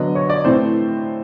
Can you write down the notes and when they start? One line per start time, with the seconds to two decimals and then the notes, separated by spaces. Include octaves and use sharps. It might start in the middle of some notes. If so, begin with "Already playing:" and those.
Already playing: D3 F#3 B3 D#5
0.15 C#5
0.30 D5
0.45 A2 E3 A3 C4 C5